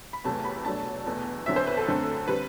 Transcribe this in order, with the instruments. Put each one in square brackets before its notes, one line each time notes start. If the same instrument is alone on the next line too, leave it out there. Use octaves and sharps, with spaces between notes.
[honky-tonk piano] B5
E2 C3 F#3 A3 A5
B5
B2 F#3 A3 D4 A5
E2 B2 A3
E2 D3 F#3 C4 E5
C5
B4
A4
F#2 D3 A3 C4
D3 G3 C4 B4